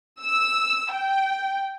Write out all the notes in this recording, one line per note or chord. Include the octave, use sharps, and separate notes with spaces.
E6
G5